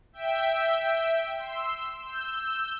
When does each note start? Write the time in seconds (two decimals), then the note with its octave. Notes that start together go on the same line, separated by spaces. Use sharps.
0.13 E5 G5
1.39 C6 E6
2.02 E6 G6
2.33 E6 G6